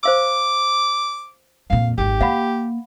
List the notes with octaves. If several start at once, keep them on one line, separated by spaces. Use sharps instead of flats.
C5 F5 D6 E6
F2 A#2 F5
G#1 F2 G4
A#3 F5 F#5 B5